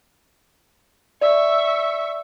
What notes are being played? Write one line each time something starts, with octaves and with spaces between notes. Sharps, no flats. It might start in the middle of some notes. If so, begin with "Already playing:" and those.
D5 E5 C#6